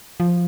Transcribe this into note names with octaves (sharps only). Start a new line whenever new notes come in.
F3